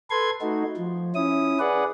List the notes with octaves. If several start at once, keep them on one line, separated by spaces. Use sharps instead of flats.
A4 B4 C6 G#6
A3 D#4 F#4
F3
C#4 E4 D#6
G#4 B4 D5 F#5